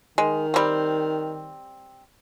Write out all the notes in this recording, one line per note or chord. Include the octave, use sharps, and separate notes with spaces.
D#3 G#3
G3 C4